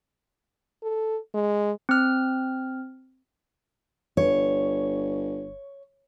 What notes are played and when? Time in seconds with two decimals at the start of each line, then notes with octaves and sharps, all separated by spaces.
0.83 A4
1.34 G#3
1.89 C4 F6
4.17 G1 C#5